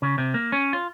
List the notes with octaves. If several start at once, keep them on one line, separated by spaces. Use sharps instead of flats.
C#3
C3
A#3
C#4
F4